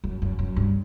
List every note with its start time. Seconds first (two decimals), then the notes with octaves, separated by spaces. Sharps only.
0.04 F#2
0.22 F#2
0.39 F#2
0.56 G2